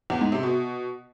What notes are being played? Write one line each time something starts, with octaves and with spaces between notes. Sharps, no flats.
E2
G#2
C3
B2